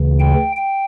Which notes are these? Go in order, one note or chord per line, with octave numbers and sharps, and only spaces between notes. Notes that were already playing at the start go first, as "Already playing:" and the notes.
Already playing: D2 C#3 E3
G5
G5